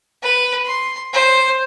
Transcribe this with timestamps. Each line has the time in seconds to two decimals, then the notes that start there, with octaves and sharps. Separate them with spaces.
0.22 B4
0.66 C6
1.13 C5